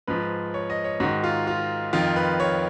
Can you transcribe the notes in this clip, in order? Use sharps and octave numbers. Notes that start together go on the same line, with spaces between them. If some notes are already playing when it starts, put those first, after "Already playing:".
G#2 F3 B4
C#5
D#5
C#5
G#2 D#3 F#4
F4
F4
F2 D#3 F4
B4
C#5